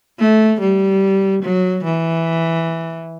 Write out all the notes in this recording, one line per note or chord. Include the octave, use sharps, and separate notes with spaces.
A3
G3
F#3
E3